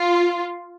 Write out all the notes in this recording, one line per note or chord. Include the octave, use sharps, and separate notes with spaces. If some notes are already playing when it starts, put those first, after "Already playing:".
Already playing: F4